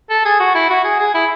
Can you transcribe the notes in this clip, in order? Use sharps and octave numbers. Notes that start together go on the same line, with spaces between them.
A4
G#4
F#4
E4
F#4
G#4
G#4
E4